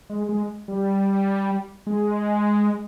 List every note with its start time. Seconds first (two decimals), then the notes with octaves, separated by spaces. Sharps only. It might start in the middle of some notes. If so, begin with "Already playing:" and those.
0.10 G#3
0.29 G#3
0.68 G3
1.87 G#3